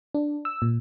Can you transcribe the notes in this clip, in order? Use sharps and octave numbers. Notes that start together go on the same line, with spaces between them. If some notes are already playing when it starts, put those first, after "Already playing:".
D4
E6
A#2